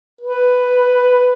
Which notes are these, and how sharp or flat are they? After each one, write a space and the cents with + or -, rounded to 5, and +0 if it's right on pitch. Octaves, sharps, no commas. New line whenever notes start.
B4 +5